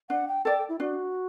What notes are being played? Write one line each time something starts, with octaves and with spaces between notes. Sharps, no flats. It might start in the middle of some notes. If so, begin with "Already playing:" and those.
D4 F#5
G5
A4 D5 G5
E4
D4 F#4